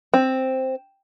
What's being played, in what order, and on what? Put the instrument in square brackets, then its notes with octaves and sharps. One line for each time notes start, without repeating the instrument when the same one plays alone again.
[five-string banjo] C4